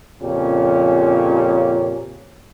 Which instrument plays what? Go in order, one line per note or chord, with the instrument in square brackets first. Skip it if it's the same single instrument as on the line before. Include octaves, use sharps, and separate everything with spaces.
[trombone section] F2 A#2 C#3 F3 C#4 G4